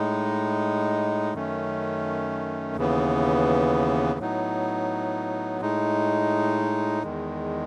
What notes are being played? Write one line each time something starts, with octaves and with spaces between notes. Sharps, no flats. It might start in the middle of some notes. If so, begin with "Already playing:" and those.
Already playing: A2 G#3 D#4
F#2 D#3 A3 C#4
D#2 C#3 E3 B3
A2 F#3 B3 D#4
A2 G#3 D#4
E2 D#3 G#3